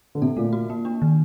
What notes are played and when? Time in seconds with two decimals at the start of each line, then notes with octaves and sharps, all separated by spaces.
0.15 D3
0.22 C3 A4
0.37 A#2 A3
0.53 F#4
0.70 A#3
0.85 D4
1.02 D#3